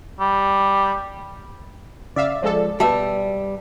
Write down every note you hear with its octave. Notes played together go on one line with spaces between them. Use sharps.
G3
C#3 D5 E5 F5
F3 G#3 A4
B2 G3 B4 E5 A5